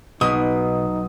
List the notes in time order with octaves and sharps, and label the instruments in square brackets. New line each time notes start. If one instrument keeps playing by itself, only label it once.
[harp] B1 B3 [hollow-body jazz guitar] B2 [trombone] D#4 [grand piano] D#6